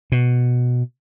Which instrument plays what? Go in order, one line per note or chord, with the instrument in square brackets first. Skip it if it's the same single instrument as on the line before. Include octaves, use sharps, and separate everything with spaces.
[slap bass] B2